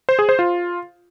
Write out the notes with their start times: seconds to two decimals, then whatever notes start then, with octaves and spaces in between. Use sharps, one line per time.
0.09 C5
0.19 G#4
0.29 C5
0.39 F4